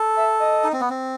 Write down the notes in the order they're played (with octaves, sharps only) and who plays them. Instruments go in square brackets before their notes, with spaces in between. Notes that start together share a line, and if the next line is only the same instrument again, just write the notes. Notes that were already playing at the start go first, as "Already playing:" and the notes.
Already playing: [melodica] A4
[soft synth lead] E5
D#5
[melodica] D#4
C4
B3
C4